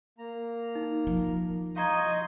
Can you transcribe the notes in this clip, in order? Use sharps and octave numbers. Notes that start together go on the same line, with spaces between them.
A#3 A#5
D#4
F3
D#5 F5 A#5 C6 C#6 G6 G#6